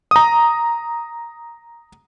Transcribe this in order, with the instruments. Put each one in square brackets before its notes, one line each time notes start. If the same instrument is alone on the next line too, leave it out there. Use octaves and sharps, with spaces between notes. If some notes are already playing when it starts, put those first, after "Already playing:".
[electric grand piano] A#5 D#6